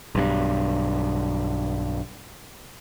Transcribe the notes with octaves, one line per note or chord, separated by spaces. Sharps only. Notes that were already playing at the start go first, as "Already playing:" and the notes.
B1 G2